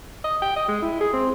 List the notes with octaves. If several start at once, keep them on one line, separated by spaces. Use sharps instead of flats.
D#5
G5
D#5
G#3
E4
G#4
C4